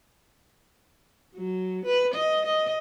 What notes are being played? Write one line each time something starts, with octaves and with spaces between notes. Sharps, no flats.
F#3
B4
D#5
D#5